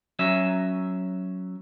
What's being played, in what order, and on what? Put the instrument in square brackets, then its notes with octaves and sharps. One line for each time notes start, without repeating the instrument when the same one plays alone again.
[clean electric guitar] F#3 C#4 E5